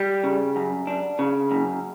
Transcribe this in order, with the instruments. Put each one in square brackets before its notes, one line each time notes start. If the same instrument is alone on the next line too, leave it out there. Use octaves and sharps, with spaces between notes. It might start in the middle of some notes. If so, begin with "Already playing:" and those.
Already playing: [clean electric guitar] G3
C#3
F#2
D4
C#3
F#2